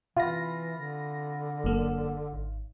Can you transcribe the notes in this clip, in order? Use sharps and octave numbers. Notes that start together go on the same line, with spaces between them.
C3 E3 F4 B5 A#6
D3
F#1 F#2 A#3 A4
G#1